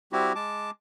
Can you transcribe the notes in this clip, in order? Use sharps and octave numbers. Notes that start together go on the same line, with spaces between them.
G3 C4 E4 F#4 G4
G#3 A5 D6